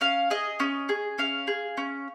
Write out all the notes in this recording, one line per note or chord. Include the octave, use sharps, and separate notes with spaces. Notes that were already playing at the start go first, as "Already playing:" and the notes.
C#4 F5
G#4 D#5
C#4
G#4
C#4 F5
G#4
C#4